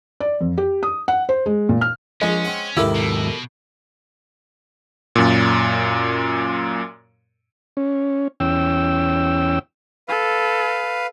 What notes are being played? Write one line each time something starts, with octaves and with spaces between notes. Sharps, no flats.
D5
F2
G4
D#6
F#5
C5
G#3
A#2
F6
A#1 F3 G#3 C#4
C4 F#5
D#2 G#2 E4 G4 A4 A#4
B2
F#2 A#2
C#4
E2 C#4 G5 E6
A4 B4 F5